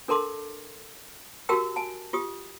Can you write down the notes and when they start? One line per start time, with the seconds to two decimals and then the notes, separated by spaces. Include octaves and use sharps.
0.08 D4 A4 A#4 A5 C6 D6
1.49 F#4 G4 A#4 G5 A5 E6
1.76 G#5 A5
2.13 F4 G4 D#6